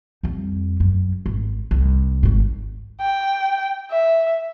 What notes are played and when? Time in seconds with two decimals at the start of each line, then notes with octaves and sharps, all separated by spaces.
0.23 F2 G3
0.80 F#2
1.26 G#1
1.71 C2
2.23 G#1 G#2
3.01 G5
3.91 E5